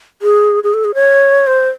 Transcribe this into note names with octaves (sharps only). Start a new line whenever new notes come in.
G#4
G#4
A4
G#4
C#5
C5